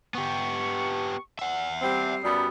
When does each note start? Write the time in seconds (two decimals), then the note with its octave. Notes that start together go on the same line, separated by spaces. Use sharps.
0.15 B3 G4 C#6
1.39 E5 F#5
1.82 G3 C4 C7
2.24 F#2 F#3 G3 B3